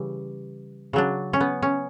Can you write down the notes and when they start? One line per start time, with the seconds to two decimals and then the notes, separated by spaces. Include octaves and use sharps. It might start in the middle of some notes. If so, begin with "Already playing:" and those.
Already playing: C#3 E3 G3
0.93 C#3 F#3 D4
1.33 C#4
1.40 B3
1.62 C#4